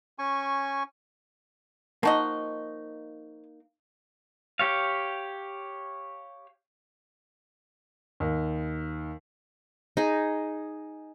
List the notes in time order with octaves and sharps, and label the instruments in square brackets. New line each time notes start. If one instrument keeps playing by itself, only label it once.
[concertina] C#4 G#5 C#6
[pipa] F3 F#4 D#5 [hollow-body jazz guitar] A#3 D#4
[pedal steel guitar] G4 C#5 F5
[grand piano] D#2
[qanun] D#4 G#4